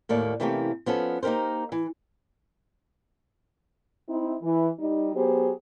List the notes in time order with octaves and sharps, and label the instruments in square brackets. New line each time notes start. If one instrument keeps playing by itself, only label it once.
[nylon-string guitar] D#2 A2 A#3 D5
C3 E3 A3 A#3 C#4 G4
F3 B3 C#4 A4
A#3 D#4 G4 A#4 C5
E3
[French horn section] C4 D#4 E4
E3
G3 D#4
F#3 B3 G4 G#4 C5